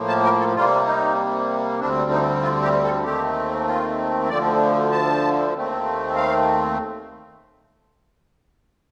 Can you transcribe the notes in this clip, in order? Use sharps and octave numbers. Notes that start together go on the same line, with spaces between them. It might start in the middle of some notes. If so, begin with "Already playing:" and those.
Already playing: A2 F3 A#3
A5
A#4
A4
C3 G3 A#3 F4
D#4
D2 D3 G3 C4 D4
D#4
F4
G4
A4
D#2 D#3 A3 C4 G4
F4
D2 D3 F3 D5
A5
D#2 D#3 A3 C4
F5